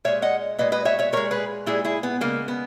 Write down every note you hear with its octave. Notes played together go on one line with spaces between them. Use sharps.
A#2 G#3 C#5 E5
D#5 F#5
A#2 G#3 B4 D#5
B4 D#5
C#5 E5
C#5 E5
A#2 G#3 A#4 C#5
G#4 B4
A#2 G#3 E4 G#4
E4 G#4
B3
C#3 G#3 A#3
B3